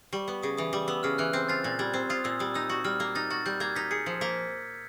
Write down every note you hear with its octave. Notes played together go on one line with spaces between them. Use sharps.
G3 C#6
B3
C#3 D#6
E3 D#6
G3 D6
B3 E6
C#3 F6
E3 F#6
C4 G6
F4 A6
A#2 A6
G3 G#6
C4
F4 D#6
A#2 E6
G3 D#6
D#4 E6
F#4
G3 F6
A#3
D#4 A6
F#4 A6
G3 G6
A#3 G#6
D#4 B6
G#4 C#7
F3
A#3 B6